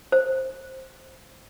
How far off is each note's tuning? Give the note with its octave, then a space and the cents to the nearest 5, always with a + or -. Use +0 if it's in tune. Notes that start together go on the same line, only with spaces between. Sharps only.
C5 +5